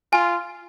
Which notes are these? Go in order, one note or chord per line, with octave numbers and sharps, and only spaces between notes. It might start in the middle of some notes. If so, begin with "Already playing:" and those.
F4 G#5